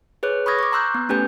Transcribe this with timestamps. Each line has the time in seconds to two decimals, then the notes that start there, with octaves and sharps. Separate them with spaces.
0.23 G#4 B4 C#5 F#6
0.46 B5 C#6 D#6 F6 G#6 A#6
0.59 C#6 D6
0.72 A#5 C6 E6 F#6 G6
0.95 B3
1.09 A3 C#4 G4 B4 G#5 G6